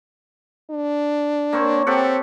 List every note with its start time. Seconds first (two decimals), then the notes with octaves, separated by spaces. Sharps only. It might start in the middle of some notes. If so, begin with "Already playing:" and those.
0.71 D4
1.53 A#3 C4 C#5
1.87 C4 G4 A4 F#5